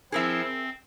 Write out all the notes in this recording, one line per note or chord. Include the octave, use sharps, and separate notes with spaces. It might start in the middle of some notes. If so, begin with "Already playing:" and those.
F3 C4 E4 G#4 A#4 E5
C4